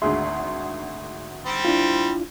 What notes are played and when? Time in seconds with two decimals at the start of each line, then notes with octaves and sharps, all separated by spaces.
0.02 G#1 D2 G#4 E5 C6
1.46 G3 C4
1.65 D4 E4 F4